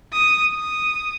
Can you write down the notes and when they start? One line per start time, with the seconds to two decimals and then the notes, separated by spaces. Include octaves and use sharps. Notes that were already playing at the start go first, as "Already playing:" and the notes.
0.12 D#6
0.55 D#6